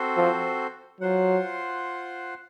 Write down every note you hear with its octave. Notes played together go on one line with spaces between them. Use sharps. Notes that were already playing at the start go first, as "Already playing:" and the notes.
Already playing: C4 F#4 A4 C5
F3
F#3 F4 C5 F#5